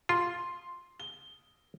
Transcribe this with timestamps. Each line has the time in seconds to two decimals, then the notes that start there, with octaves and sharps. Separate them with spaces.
0.09 F4 C6
1.00 G7